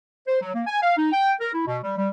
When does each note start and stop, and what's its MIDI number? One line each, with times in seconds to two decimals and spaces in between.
0.27 0.38 72
0.41 0.53 54
0.55 0.62 58
0.67 0.82 80
0.83 0.97 77
0.97 1.11 63
1.13 1.32 79
1.40 1.50 70
1.54 1.65 64
1.67 1.77 47
1.83 1.95 55
1.98 2.09 55